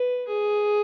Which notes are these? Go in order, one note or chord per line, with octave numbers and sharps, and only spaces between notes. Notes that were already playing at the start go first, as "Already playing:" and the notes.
Already playing: B4
G#4